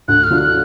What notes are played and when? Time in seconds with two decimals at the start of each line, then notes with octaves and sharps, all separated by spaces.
0.08 D2 F#6
0.23 F6
0.30 D3 F#3 D4 F4
0.38 F#6